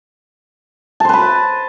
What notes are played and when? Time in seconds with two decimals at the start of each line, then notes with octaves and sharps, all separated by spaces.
1.00 A5
1.05 C5
1.09 B4
1.14 B5